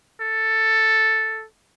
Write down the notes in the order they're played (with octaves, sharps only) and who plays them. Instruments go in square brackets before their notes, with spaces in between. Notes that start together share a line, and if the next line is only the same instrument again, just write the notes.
[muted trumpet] A4